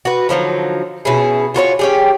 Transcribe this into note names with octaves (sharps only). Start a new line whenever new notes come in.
F#4 B4
D3 F3 F#3 D#4
B2 C#4 E4 G#4
F4 F#4 A#4 C#5
C#4 G4 G#4